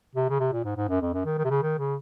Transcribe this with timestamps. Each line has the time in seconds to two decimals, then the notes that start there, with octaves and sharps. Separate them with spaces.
0.15 C3
0.30 C#3
0.39 C3
0.53 A#2
0.64 G#2
0.76 G#2
0.89 F#2
1.01 F2
1.13 F#2
1.25 D#3
1.38 D#3
1.45 C3
1.50 C#3
1.62 D#3
1.78 C#3